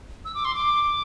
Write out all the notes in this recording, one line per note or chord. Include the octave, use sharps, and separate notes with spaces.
E6
D6
C6
D6